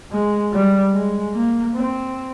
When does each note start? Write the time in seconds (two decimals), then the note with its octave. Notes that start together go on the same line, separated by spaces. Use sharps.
0.11 G#3
0.52 G3
0.93 G#3
1.33 A#3
1.75 C4